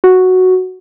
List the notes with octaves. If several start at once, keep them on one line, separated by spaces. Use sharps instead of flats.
F#4